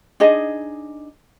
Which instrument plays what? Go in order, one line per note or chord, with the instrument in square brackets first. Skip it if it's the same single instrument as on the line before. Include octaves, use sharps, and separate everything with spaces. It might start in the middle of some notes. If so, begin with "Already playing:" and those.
[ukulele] D4 D#4 G#4 D#5